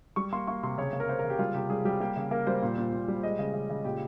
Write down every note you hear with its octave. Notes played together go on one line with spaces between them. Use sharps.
G3 C#6
A#3 C6
A#3 C#6
C3 C6
C#3 C#5
A#3
A#4
A#3 C5
A#4
C#3
G4
G3 F4
C3 G4
G3 G#4
G3 G4
A#3 G4
C#3
A#3 A#4
G3 C5
A#2
A#2
A#2
G3
G#3 D#5
C#3
C#3
C#3
A#2 G4